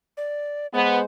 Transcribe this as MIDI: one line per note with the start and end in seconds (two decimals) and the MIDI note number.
0.17 0.67 74
0.74 1.04 56
0.74 0.97 59
0.74 1.04 72